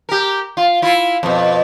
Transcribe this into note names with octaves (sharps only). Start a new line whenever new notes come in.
G4 A#4
F4
E4 F4
F2 B2